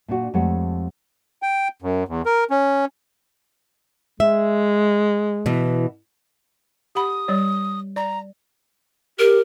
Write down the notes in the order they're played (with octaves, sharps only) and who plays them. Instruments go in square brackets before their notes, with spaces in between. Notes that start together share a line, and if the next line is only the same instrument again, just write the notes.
[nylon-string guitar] A#2 D4 F#4
F2 G#3 A3 G4 C#5 F#5
[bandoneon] G5
F#2
E2
A#4
C#4
[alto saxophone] G#3 [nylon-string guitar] E5
[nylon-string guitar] B2 E3
[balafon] G4 F#5 B5 [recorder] D#6
[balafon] G3 C#5 D5
[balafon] D5 [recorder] A#5
[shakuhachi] G4 [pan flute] A#4